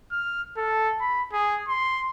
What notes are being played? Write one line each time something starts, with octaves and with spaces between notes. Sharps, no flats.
F6
A4
B5
G#4
C6